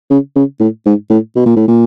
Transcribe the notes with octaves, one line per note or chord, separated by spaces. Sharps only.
C#3
C#3
A2
G#2
A2
B2
A#2
A2
A#2